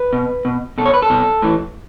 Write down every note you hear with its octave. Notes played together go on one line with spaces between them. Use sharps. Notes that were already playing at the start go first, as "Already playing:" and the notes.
Already playing: B4
B2
B2
B2 A4
C#5
B4
A4
B2
A2 E3